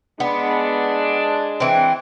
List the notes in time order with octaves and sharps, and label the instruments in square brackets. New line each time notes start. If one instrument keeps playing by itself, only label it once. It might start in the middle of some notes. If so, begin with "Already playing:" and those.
[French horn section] G#3 D4 [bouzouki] B3
[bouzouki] E3 C4